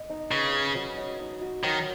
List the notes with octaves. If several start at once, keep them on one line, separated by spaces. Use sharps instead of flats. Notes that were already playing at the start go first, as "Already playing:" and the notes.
Already playing: D#5
D#4
C#3 B4
D#5
F#3
D#5
D#4
F#4
D#3 F#3